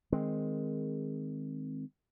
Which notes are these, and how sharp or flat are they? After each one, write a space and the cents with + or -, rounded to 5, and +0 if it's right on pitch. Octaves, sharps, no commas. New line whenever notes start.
D#3 +0 G#3 +0 C4 +0